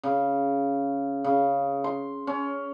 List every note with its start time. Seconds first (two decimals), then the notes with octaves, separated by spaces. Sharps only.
0.03 C#3
1.24 C#3
1.84 C6
2.27 C#4